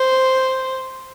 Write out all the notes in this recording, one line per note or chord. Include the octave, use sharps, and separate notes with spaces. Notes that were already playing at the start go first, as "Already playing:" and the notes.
Already playing: C5